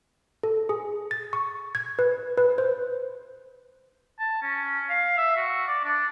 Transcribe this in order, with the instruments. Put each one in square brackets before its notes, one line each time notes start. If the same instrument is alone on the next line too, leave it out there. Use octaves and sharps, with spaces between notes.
[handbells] A4
G#4
A6
C#6
G#6
B4
B4
C5
[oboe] A5
C#4
F5
E5
F#4
D5
D4